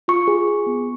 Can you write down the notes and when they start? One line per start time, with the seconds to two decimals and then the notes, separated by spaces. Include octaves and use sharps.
0.08 F4 C#6
0.28 G#4
0.48 G#4
0.66 B3